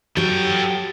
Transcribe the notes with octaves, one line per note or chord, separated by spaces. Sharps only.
F#3 G4 A4 G5